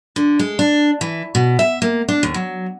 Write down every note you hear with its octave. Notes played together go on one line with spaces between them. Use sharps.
D3
G#3
D4
E3
B2
E5
A#3
D4
D#2
F#3